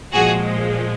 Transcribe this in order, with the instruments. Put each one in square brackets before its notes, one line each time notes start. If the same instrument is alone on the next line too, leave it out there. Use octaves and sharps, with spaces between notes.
[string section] A#2 F3 G#3 F#4 G#4